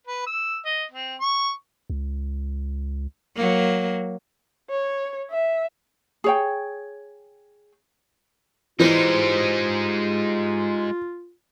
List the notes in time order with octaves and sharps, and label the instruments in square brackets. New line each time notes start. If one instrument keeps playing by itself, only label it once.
[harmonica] B4
E6
D#5
C4
C#6
[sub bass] C#2
[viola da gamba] F#3 A#3
[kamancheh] C#5
E5
[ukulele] G#4 C#5 G5
[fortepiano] E3 [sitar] G3 C5 [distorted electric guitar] G#3 D#4 [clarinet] F4